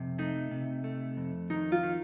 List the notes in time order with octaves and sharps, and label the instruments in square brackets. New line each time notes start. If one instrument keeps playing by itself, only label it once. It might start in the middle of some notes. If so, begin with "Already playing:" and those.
Already playing: [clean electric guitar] F2 C3
[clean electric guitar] A3 [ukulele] D#4
[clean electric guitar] C3
A3
F2
[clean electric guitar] D#3 [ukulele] D#4
[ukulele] F4
[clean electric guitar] D#3